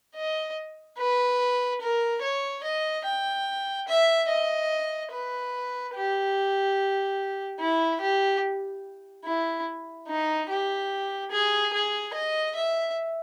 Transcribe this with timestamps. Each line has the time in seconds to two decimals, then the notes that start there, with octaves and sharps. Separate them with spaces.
0.15 D#5
0.98 B4
1.81 A#4
2.22 C#5
2.63 D#5
3.05 G5
3.88 E5
4.29 D#5
5.11 B4
5.94 G4
7.59 E4
8.00 G4
9.24 E4
10.08 D#4
10.49 G4
11.31 G#4
11.73 G#4
12.14 D#5
12.56 E5